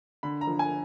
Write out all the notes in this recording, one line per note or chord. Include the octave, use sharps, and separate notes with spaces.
D3 B5
A#5
F3
G#5